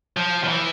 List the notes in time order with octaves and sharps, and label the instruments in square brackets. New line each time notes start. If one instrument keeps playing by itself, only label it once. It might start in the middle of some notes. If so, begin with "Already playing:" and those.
[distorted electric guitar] F3
F3
E3